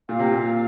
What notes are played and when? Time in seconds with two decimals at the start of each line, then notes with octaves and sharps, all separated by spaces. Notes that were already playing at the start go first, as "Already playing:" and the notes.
0.09 A#2 F5
0.19 C3
0.31 A#2